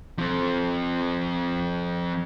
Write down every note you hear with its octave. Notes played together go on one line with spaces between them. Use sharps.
F3 C4